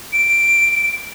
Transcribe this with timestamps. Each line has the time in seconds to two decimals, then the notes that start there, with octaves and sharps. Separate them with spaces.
0.13 D7